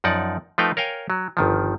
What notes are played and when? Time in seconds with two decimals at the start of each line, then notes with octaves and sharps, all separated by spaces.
0.04 F#2 F3 D#4 D5 F#5
0.58 F3 A3 D#4 B4 F5 G5
0.77 A#4 C#5 F5 G5 G#5
1.10 F#3
1.37 G1 D#3 F3